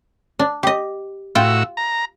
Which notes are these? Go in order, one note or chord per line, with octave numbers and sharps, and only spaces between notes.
D4
G4 D#5
A2 F4 F#4 G5 E6
A#5